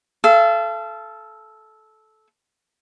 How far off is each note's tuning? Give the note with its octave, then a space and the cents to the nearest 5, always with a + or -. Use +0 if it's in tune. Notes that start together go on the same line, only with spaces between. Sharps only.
A4 -15 F5 -40